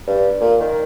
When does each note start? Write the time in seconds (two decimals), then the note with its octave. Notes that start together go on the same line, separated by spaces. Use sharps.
0.07 G2
0.40 A#2
0.60 D#3